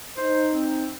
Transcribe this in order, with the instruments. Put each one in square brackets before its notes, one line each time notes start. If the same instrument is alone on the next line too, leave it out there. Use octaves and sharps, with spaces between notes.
[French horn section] D#4 [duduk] C5
[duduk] C4